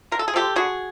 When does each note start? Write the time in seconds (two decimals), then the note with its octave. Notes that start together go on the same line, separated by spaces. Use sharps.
0.12 D3 A#4
0.19 A4
0.28 G#4
0.34 F3 G#3 G4 A4
0.56 D3 F#4 G#4